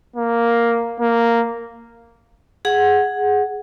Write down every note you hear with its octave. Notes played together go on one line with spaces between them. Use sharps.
A#3
A#3
G#4 F#5